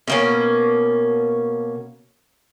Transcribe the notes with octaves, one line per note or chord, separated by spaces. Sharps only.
B2 A#3 C#4